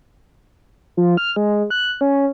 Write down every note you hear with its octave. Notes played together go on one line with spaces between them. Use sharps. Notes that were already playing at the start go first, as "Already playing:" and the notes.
F3
F6
G#3
F#6
C#4